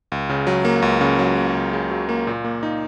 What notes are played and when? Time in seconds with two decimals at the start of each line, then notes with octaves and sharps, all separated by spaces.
0.12 C#2
0.30 C#3
0.47 F#3
0.65 A#3
0.82 C#2
1.01 C#3
1.19 F#3
1.37 A#3
1.55 C#2
1.73 C#3
1.91 F#3
2.09 A#3
2.27 A#2
2.44 A#3
2.63 D#4